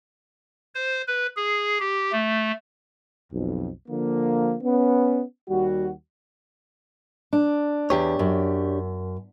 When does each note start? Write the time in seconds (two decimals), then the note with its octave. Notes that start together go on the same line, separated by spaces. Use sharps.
0.75 C5
1.07 B4
1.36 G#4
1.80 G4
2.12 A3
3.33 B1 F2
3.89 D3 F3 A#3
4.62 B3 C#4
5.49 D#2 G3 F#4
7.33 D4
7.90 E2 D4 G4 C#5
8.19 F#2